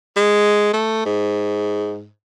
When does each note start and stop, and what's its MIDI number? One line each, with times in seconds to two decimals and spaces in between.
0.16 0.72 56
0.73 1.04 57
1.05 2.08 44